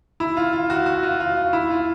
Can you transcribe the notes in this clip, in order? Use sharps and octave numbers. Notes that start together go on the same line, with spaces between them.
E4
F4
F4
F#4
F#4
F4
F4
F4
E4
F4